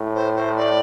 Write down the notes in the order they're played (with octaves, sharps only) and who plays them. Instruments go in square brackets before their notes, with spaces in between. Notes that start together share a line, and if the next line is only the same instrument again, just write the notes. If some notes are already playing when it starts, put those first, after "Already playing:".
Already playing: [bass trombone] A2
[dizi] C5
C5
D5